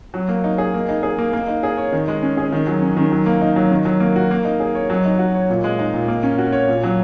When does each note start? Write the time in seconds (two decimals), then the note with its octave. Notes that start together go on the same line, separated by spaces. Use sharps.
0.14 F#3
0.28 A#3
0.44 D#4
0.58 G#4
0.74 A#3
0.89 D#4
1.03 G#4
1.18 A#3
1.33 A#3
1.48 D#4
1.63 G#4
1.77 C#5
1.92 D#3
2.08 G#3
2.23 C#4
2.37 G#4
2.52 D#3
2.67 F#3
2.82 C#4
2.97 D#3
3.12 F#3
3.26 A#3
3.41 D#4
3.56 F#3
3.71 D#3
3.85 F#3
4.00 A#3
4.16 F#4
4.31 A#3
4.45 D#4
4.60 G#4
4.75 C#5
4.90 F#3
5.05 D#4
5.19 F#4
5.35 C#5
5.50 A#2
5.64 G#3
5.79 D#4
5.94 A#2
6.08 A#3
6.23 C#4
6.38 F#4
6.53 C#5
6.68 A#2
6.83 F#3